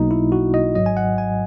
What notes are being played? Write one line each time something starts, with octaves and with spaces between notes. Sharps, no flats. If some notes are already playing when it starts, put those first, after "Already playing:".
Already playing: B1 B2 F#3 A#3 D#4
E4
F#4
D#5
G#1 G#2 F#3 D#5
G#5
F#5
G#5